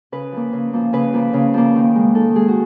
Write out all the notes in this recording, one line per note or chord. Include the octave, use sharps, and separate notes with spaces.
C#3 B4
F3 A#3
C#3
F3 A#3
C#3 B4
F3 A#3
C#3
F3 A#3
D#3
G#3
D#3 A4
G#3 G#4
F#4